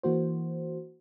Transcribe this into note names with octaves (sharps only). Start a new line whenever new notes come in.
E3 A#3 F#4 C5